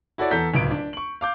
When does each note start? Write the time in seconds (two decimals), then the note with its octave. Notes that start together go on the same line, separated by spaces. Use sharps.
0.18 E4 F#4 A4 C#5 D5
0.31 E2 A4 A#5 G6 B6
0.54 D1 C#2 D7
0.71 D4
0.93 C#6 F#7
1.21 F5 D6 G6